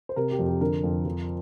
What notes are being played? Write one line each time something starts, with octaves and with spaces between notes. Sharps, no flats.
C5
C3 A#4
G4
F2
G4
D3 A#4
F2
F3